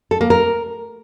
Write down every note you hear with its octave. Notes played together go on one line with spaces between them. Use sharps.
A4
A#3
A#4